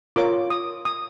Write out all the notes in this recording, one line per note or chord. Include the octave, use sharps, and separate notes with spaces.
F4 A#4 C#5 D6
D#6
D#6